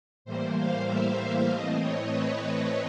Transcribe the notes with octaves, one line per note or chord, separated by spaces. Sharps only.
A2 E3 G3 A#3 C5
F5
E5
A2 E3 A3 C4 D#5
C#5
B4